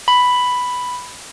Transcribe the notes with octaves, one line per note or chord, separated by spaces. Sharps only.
B5